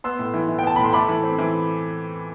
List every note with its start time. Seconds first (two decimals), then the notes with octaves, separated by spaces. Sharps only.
0.04 B3 C6 E6
0.19 A2
0.34 E3
0.49 E3
0.59 G5
0.63 B3 A5
0.76 A2 B5
0.84 C6
0.93 A3 B5 D6
1.09 E3
1.24 C4
1.39 E3